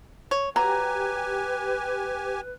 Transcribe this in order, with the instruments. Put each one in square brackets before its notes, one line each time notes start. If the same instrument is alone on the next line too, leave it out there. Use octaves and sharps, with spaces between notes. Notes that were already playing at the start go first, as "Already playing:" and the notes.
[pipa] C#5
[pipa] F#3 [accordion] G4 G#5 [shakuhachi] B4 [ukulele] A#5